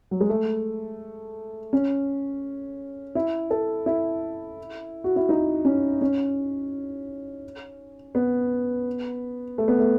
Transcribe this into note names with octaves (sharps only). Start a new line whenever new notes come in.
F#3
G#3
A3
C#4
E4
A4
E4
F#4
E4
D#4
C#4
C#4
B3
A3
B3
A3